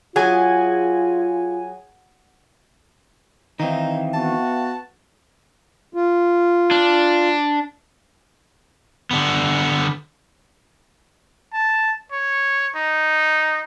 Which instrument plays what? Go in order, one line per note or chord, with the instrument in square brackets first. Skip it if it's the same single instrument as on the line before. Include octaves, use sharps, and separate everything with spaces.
[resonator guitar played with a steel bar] F#3 [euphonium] F4 [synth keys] G#4 G#5
[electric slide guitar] D#3 E3 C4 [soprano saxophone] D#4 [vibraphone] E5 F5 G5
[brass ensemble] B3 F#4 [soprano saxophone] A5
[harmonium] F4
[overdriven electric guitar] D4
D3 B3
[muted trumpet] A5
C#5
D#4